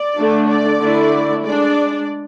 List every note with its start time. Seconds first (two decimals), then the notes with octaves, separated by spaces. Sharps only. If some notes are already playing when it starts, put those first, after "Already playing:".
Already playing: D5
0.17 D3 A3 D4
0.49 D5
0.80 D3 A3 E4
1.44 G#3 D4 D5